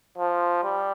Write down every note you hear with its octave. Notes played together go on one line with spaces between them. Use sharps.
F3
G3